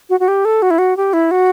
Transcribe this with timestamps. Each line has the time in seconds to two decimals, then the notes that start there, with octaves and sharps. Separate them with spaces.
0.10 F#4
0.20 F#4
0.28 G4
0.45 A4
0.62 F#4
0.71 E4
0.78 F#4
0.97 G4
1.13 E4
1.31 F#4